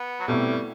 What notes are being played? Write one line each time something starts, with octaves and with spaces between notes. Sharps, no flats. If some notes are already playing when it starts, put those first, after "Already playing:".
Already playing: B3
F#3
B2 G3 A3 C4 E4